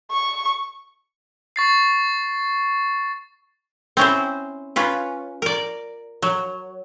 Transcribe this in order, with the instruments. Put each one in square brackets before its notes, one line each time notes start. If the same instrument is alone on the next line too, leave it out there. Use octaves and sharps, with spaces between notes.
[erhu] C#6
[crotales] C#6 A6 C7
[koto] C4 C#4 E4 C5
C#4 F4 B4
A#4 D5
F#3